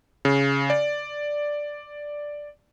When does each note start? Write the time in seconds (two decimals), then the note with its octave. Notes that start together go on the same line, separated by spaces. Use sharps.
0.25 C#3
0.70 D5